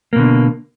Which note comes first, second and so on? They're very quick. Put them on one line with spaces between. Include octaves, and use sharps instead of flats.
A#3 B2 D3